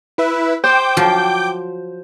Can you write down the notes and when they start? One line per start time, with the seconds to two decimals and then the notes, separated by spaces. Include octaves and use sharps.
0.18 E4 B4 E5
0.64 C5 G5 D6 G6
0.97 F3 F#3